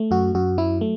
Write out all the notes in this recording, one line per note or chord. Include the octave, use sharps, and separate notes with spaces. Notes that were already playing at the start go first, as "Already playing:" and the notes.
Already playing: A3
F#2 F#4
F#2 F#4
F#3 E4
A3